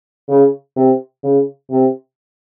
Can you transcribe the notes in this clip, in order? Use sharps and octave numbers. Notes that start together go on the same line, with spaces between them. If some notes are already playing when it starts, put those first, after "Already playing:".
C#3
C3
C#3
C3